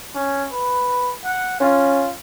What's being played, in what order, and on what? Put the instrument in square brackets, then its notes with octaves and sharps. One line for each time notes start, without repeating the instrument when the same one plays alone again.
[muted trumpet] C#4
B4
F#5
[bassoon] C#4 [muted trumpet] F4